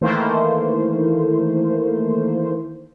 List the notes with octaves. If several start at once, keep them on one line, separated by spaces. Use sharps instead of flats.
D#3 E3 A3 A#3 C5